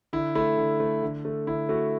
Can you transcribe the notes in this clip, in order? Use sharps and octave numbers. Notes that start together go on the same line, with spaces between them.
D3 E4
A3 E4
D3
A3
D3
A3
D3 E4
A3 F#4